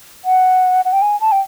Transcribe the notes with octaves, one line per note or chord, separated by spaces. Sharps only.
F#5
F#5
G5
G#5
A5
G5